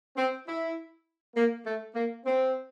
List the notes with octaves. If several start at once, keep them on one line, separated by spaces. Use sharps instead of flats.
C4
E4
A#3
A3
A#3
C4